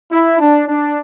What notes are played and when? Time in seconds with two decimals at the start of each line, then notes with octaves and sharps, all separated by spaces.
0.11 E4
0.39 D4
0.67 D4